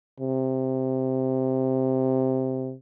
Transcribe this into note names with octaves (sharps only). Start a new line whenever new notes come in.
C3